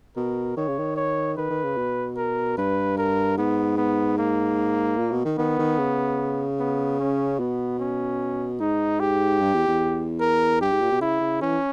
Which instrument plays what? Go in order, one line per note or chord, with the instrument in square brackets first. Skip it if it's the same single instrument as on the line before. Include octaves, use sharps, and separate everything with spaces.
[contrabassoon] B2 [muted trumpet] A#4
[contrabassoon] D#3 [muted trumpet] C#5
[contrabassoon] C#3
D#3
[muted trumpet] C#5
[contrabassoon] D#3 [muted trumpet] B4
[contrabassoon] D#3
C#3
B2
[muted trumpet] A#4
[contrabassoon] G2 [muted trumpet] B4
[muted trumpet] A#4
[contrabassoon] G#2 [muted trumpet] B3
[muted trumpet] B3
A#3
[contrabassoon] A#2
B2
D#3
[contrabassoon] D#3 [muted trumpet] B3
[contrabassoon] D#3
C#3
[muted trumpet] B3
C#4
[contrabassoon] B2 [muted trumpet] B3
[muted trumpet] C#4
[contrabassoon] G#2 [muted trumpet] D#4
[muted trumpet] G4
[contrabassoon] G2
E2
E2
[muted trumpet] A#4
[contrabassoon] G2 [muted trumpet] G4
[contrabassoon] G#2
A#2
B2
[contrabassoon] C#3 [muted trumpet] E4
[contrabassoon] C#3
[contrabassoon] E3 [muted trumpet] C#4